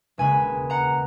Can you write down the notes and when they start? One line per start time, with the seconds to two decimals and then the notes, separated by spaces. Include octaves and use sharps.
0.18 E1 D#2 C#3 G#3 G#5 B5
0.70 F#5 A#5